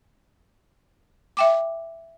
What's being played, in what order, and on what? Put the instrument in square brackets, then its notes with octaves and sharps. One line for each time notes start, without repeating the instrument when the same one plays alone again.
[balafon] E5 G5 D6